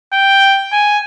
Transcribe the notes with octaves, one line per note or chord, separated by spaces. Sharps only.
G5
G#5